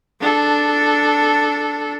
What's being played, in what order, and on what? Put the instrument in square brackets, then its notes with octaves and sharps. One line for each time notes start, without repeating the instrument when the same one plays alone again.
[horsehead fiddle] D4 A4